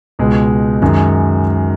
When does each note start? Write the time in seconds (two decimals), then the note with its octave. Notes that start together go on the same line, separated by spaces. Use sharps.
0.19 C#2 B2 G#3
0.82 F#2 D#3 G#3 D#4